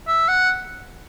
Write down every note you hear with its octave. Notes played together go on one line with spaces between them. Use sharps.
E5
F#5